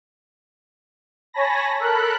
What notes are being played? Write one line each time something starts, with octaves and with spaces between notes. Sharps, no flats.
C#5 G#5 A5 B5 A#6
A4 A#4 B5 F#6